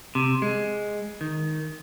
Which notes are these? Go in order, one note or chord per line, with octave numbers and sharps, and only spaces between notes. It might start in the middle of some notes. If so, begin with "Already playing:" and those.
C3
G#3
D#3